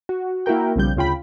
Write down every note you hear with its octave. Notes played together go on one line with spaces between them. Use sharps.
F#4
A#3 E4 F#4 A#4 G5
B1 C#3 F3 G3 G6
D2 C#3 F4 G5 B5